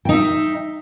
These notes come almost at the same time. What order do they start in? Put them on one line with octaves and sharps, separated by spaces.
G5 D#4 E5